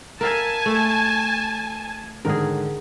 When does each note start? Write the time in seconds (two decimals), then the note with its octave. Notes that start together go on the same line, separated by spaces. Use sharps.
0.21 A#4 E5 F5 G#5 A5
0.66 A3
2.25 G#2 D3 D#3 G#4 A#4